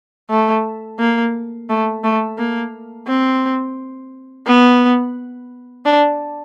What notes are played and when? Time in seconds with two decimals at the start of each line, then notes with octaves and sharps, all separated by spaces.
0.30 A3
0.99 A#3
1.69 A3
2.04 A3
2.39 A#3
3.07 C4
4.47 B3
5.86 D4